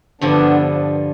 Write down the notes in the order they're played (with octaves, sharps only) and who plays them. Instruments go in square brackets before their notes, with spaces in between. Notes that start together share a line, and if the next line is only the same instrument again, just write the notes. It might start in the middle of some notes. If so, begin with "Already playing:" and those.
[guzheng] G2 D3 F3 [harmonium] B3 D4